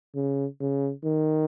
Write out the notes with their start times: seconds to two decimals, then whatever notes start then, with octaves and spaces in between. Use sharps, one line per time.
0.15 C#3
0.60 C#3
1.04 D#3